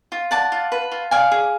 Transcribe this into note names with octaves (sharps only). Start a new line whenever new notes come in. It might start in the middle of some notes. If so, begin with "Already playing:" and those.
F4
D5 F#5 A5
F4
B4
F4
D5 F5 G#5
G#4